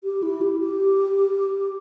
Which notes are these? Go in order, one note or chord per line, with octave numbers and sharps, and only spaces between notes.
G4
E4
G4
G4